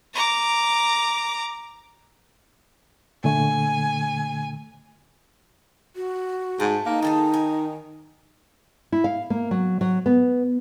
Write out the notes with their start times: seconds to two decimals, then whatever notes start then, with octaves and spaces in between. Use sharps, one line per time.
0.14 A#5 D6
3.24 A#2 D3 A3 G#5
5.96 F#4
6.60 G#2 A3
6.86 A#3 D#4
7.02 D#3 G#4 A4 G#5
7.34 G#5
8.92 E4
9.04 F5
9.30 A#3
9.51 F#3
9.81 F#3
10.06 B3